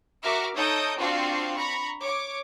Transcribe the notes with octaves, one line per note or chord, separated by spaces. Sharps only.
F#4 A#4 E5 D6 F6
D#4 A4 C#5 D#6 G6 D7
C4 D4 F4 F#4 F5
A#5 B5 C#6
C#5 D6